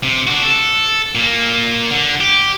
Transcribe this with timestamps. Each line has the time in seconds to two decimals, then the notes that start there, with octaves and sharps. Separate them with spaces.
0.04 C3
0.27 D4 F#4
0.43 A4
1.15 A#2 A#3
1.91 D3
2.21 G4